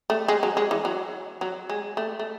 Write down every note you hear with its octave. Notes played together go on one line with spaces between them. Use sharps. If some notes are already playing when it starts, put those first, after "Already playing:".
A3
G#3
F#3
G#3
E3
F#3
F#3
G#3
A3
A3